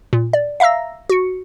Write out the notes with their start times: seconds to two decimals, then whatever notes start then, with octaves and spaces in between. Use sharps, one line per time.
0.13 A#2
0.33 D5
0.60 E5 F5 A#5 E6 A#6
1.09 F#4 C#7